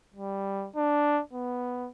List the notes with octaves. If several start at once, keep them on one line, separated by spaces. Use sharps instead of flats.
G3
D4
B3